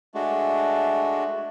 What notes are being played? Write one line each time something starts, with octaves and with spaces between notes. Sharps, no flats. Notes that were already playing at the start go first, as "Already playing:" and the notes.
G#3 A3 D4 F#4